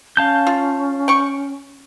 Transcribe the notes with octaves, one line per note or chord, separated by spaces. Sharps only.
C#4 F5 A5 G6
F4
G5 C#6